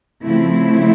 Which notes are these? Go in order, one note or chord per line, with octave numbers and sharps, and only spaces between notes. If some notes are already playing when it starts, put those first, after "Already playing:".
C#3 F3 A3 C4 E4